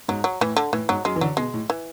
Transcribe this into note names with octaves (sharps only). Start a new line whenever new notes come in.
G#2 F#3
F#3
A2 E3
D3
A2 E3
G#2 F#3
F#2 G#3
E3
D3 F#3
B2 G#3
A2
E3